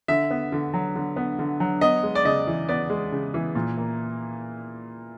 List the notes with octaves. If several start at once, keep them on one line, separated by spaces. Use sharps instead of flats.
D3 E5
B3
D3
F#3
D3
B3
D3
F#3
B3 D#5
G#3
D5
C#3 D#5
E3
B3 D5
G#3
C#3
E3
A#2
A#3